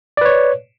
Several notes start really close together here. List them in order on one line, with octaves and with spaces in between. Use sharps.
D5 B4 C#5